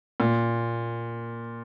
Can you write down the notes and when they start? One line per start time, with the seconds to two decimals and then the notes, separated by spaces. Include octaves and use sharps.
0.20 A#2